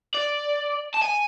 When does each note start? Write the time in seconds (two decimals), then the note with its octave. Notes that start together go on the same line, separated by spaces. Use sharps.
0.15 D5
0.94 A5
1.02 G#5